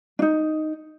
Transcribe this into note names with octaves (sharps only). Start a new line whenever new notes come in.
D4 D#4